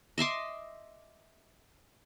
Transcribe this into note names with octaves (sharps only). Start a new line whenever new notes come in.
D#5 E5 C6 D6